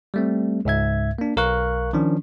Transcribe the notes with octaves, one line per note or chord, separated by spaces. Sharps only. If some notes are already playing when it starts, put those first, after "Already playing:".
G3 A3 C4
C#2 G#2 E5 G#6
A#3 D4
B1 A#4 F5 C#6 F#6
D#3 F3 C#4 D4